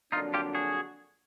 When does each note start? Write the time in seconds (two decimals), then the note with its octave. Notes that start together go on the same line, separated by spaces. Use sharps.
0.12 F2 D3 F#3 A#3 D4 D#4 F4
0.34 F4 G4
0.55 F#4 G#4